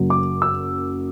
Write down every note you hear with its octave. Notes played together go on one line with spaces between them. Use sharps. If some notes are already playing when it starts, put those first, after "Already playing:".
Already playing: F#1 F#2 F#3
D6
E6